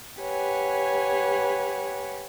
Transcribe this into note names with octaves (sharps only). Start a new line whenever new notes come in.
G4 B4 C#5 F#5 G#5